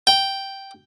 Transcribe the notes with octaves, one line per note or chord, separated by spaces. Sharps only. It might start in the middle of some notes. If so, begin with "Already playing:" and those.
G5